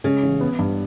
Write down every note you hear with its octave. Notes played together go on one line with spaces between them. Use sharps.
C#3 G#3
A1
B3
G2